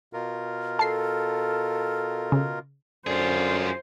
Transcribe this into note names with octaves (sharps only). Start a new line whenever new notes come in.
B2 F4 A#4
A4 A5 C7
C#3
F#2 D3 F4 G#4 C5